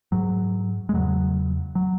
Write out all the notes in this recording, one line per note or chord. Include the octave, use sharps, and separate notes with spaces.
G#2 F#3
G#3
E2 C#3 F#3
F#3